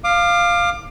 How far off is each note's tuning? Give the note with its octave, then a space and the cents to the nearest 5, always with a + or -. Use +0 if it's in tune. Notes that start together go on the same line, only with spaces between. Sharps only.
F5 +0 D6 +30